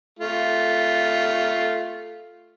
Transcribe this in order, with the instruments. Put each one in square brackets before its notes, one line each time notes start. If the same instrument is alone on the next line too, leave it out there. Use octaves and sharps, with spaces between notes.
[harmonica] A3 F4